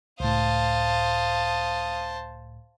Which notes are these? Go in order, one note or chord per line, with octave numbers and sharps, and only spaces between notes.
C#2 A2 C5 F5 A5 D#6